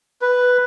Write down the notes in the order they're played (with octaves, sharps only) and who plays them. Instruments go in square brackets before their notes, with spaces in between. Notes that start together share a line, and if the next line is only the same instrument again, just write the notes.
[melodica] B4